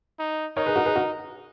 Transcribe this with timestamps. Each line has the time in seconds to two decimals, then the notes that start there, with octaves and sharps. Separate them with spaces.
0.19 D#4
0.57 D#4 A#4 C#5
0.66 G#4 B4
0.76 F#4 A#4
0.86 G#4 B4
0.95 F#4 A#4